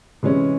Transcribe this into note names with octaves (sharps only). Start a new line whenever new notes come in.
C3 E3 G#3 C#4